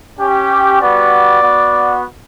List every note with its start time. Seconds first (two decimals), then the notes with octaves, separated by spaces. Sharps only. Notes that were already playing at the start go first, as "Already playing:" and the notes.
0.20 C#4 G4
0.81 G3 B3 F#4 D5
1.43 B3 F#4